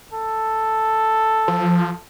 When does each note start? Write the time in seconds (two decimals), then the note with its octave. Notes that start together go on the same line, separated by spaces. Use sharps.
0.13 A4
1.48 F3